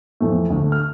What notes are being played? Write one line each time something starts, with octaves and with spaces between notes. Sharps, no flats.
F2 E3 A3
D2 D3 A3
F6